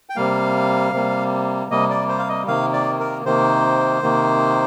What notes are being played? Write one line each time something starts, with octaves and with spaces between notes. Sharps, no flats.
G5
C3 G3 A#3 F5
C3 G3 A#3
C3 G3 A#3 D#5
D5
C5
F5
D#5
C3 D#3 A#3 F5
D5
A#4
C3 D#3 A#3 C5
C3 D#3 A#3